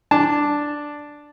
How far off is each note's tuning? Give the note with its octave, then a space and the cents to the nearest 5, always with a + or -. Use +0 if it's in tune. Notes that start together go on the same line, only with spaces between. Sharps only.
D4 +0 A5 +0